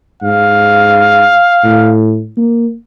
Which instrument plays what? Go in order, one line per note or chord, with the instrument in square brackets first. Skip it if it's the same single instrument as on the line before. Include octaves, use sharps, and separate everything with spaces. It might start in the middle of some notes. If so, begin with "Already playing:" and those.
[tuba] G#2 [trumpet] F5
[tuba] A2
A#3